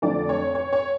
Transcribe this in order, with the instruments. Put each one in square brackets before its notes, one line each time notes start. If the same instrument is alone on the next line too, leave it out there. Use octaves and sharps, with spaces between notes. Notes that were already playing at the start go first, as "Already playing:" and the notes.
[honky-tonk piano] F2 D3 F3 A3 D5
C#5
C#5
C#5